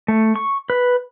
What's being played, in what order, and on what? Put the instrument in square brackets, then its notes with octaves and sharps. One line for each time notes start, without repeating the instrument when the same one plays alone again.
[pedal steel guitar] A3
C#6
B4